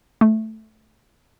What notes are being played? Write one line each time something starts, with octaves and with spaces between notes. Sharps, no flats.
A3